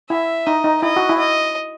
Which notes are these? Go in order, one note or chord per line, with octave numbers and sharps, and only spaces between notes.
E4 E5
D#4 D#5
D#4
E4 D#5
F#4
E4
D#5